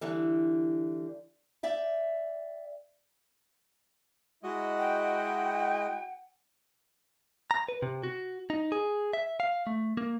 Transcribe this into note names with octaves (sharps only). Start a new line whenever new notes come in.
D3 E3 G3
D5 E5 G5
G#3 E4 F#4 D#5
F#5 G5
A#5
B4
C3
F#4
D#4
G#4
E5
F5
A3
A#3